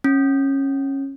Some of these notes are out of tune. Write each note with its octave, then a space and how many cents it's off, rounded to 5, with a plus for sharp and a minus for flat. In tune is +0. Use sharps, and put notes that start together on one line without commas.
C#4 -20